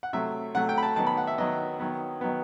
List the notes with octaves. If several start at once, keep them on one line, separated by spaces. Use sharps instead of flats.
F#5
C3 F#3 A3 E5
C3 F#3 A3 F#5
G5
B5
A5
D#3 F#3 B3 A5
B5
F#5
E5
D#3 F#3 B3 D#5
D#3 F#3 B3
D#3 F#3 B3